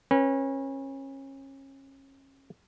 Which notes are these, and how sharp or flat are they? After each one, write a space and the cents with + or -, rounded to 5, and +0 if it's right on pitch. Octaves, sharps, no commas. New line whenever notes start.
C#4 -30 B4 -30